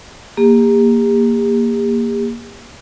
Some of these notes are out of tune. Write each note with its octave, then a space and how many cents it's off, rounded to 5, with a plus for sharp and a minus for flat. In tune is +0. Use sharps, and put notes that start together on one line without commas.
A#3 +0 G4 +45